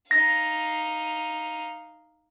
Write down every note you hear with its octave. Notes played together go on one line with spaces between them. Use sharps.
D#4 F5 A#6